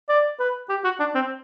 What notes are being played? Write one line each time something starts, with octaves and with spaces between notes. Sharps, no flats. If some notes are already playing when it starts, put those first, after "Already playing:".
D5
B4
G4
F#4
D4
C4